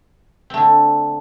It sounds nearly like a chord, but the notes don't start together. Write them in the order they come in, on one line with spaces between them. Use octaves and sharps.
C4 A3 D3